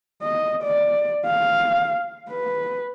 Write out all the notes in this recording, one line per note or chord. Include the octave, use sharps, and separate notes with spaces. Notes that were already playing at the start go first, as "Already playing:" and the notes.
D#5
D5
F5
B4